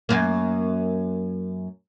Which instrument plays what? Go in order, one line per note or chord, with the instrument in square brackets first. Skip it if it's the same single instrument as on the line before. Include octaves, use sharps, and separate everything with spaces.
[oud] F#2 A#3